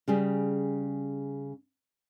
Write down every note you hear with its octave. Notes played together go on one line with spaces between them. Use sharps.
C#3 G3 G#4